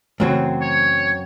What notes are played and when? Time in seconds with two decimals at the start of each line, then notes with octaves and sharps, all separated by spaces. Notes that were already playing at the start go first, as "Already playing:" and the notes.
0.20 F#2 C#3 E3 F#3 A3 C4
0.61 C#5